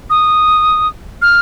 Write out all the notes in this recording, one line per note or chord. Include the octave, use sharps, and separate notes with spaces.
D#6
F6